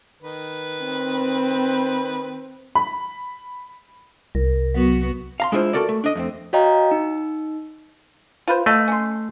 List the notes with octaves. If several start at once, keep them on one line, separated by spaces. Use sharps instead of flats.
D#3 B4
C4
B5
C2 A#4
F#3 B3 F#4
F5 A#5 C6
G#3 D4 E4 F4 C5
F#4 A4 A#4 D5
A3
D4 D#5
F2 A3 C4
F#4 C#5 D#5 F5 G5 A#5
D#4
F4 B4 C5
A3 D#5 F5 A5
C#4 C6